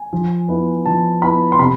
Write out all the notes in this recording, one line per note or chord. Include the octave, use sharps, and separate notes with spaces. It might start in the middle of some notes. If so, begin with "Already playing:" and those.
Already playing: G#5
F3
B3 E4
F3 A5
B3 E4 B5
C6
C3 B5